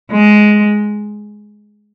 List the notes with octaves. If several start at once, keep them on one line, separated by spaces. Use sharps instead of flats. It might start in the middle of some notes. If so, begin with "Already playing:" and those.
G#3